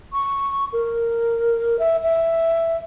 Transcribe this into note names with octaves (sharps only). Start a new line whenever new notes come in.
C#6
A#4
E5
E5